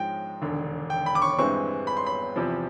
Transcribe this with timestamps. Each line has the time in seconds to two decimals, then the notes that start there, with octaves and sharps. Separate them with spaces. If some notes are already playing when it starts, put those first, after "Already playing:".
Already playing: G#2 F3 G#3 G5
0.42 E1 D#2 D3
0.90 G5
1.06 B5
1.15 D6
1.22 C#6
1.38 G2 E3 G#3 C4 C#6
1.87 B5
1.97 C6
2.07 B5
2.36 E2 C3 F3